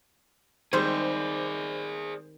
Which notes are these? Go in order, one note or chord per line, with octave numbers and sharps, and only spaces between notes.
D#3 G3 G#3 C4 G#4 C5 D5